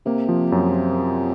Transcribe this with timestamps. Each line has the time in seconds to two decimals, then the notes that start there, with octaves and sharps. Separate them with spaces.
0.06 C3 A#3
0.29 F3
0.52 F#2